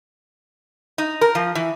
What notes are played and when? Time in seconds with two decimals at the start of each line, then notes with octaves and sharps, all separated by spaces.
0.98 D#4
1.21 A#4
1.35 F3
1.55 E3